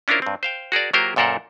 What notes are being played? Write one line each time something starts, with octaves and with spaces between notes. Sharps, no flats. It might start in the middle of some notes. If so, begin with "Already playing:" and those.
C#4 D4 E4 F4 A#4 C5
G2 C4
C5 F5 G5
F#4 G#4 A#4 D5
F#3 A#3 F4 G4 A#4 C5
F#2 A#2 A4 A#4 C5 F#5